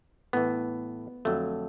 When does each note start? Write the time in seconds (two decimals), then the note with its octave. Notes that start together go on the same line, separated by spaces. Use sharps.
0.33 A2 E3 B3
1.25 F2 D3 F#3 A3